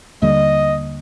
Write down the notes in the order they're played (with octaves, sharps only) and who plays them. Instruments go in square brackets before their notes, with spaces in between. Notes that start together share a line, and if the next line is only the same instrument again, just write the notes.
[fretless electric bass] D#2 D3 G3 A#3 [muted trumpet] D#5